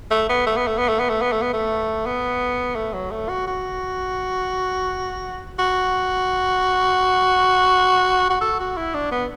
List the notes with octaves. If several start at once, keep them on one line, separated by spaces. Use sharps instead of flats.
A3
B3
A3
B3
A3
B3
A3
B3
A3
B3
A3
B3
A3
B3
A3
F#3
A3
F#4
F#4
F#4
F#4
A4
F#4
E4
D4
B3